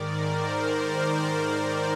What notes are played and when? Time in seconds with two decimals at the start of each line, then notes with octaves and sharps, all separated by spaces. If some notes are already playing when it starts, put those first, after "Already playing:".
Already playing: G#2 D#3 A#4 D5
0.09 C5
0.75 C5
1.41 C5